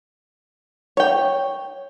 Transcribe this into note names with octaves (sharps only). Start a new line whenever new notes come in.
C#5 G5